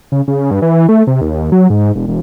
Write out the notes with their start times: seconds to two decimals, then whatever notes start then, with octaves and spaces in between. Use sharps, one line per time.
0.12 C#3
0.28 C#3
0.51 G2
0.62 E3
0.89 A3
1.07 C3
1.21 D#2
1.52 F#3
1.70 G#2
1.95 E1
2.08 E1